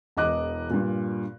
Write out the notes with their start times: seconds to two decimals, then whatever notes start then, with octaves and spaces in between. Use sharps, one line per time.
0.17 E1 E2 D#5 D6 F#6
0.70 G2 A#2